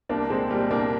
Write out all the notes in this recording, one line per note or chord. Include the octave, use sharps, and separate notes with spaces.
C2 A#3 D4
A#2 G#3 C4
A#2 G3 A#3
C2 A#3 D4